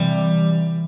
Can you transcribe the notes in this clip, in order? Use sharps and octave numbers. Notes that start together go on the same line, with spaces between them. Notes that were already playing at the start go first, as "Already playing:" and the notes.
Already playing: C3 E3 G3 G4